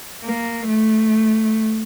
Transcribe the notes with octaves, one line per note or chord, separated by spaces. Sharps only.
A#3
A3